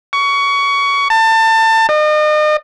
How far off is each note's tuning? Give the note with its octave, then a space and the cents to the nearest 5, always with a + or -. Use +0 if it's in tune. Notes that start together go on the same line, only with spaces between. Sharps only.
C#6 +20
A5 +25
D#5 -40